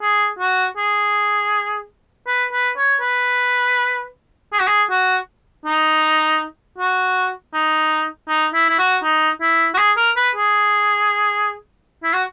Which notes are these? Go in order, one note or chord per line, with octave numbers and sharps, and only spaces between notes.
G#4
F#4
G#4
B4
B4
C#5
B4
G#4
F#4
G#4
F#4
D#4
F#4
D#4
D#4
E4
E4
F#4
D#4
E4
F#4
G#4
A#4
B4
G#4
E4
F#4